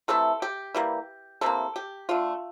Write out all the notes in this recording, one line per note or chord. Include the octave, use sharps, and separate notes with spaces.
C3 E3 A3 A4
G4
E3 G3 A#3
C3 E3 A#3 A4
G4
D3 A3 F4